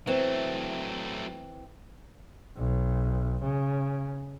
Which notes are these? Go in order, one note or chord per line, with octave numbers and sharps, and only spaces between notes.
E3 F#3 A3 C4
B1
C#3